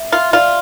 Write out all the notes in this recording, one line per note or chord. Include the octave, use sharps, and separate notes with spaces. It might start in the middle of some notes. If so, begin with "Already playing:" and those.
Already playing: E5
F4 E5
F4 D5